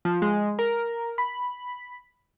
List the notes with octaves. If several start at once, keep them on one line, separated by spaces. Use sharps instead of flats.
F3
G#3
A#4
B5